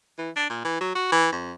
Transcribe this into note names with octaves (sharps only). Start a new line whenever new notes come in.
E3
D4
A#2
E3
F#3
F#4
E3
F2